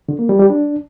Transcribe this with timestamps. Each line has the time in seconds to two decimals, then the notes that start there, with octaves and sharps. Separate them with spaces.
0.09 D3
0.19 A#3
0.29 G3
0.40 G3
0.50 D4